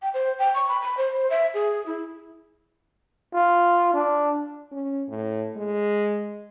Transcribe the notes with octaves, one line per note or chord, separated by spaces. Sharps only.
G5
C5
G5
C#6
B5
B5
C5
E5
G#4
E4
F4
D4
C#4
A2
G#3